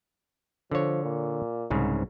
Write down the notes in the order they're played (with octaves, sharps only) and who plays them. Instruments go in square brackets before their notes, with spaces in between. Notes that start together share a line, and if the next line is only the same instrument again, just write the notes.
[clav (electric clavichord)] D3 C#5 [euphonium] F3
[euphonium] A#2
[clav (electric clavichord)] C2 G#2 C#3